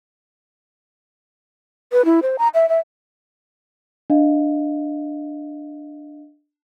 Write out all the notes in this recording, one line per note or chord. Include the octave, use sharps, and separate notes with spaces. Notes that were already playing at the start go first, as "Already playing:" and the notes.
B4
E4
C5
A#5
E5
E5
D4 D#5 F5